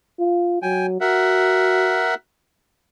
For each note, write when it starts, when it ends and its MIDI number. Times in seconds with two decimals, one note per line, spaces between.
0.19 0.59 65
0.62 0.97 54
0.62 0.86 79
0.62 0.86 80
1.01 2.15 66
1.01 2.14 70
1.01 2.14 76
1.01 2.14 78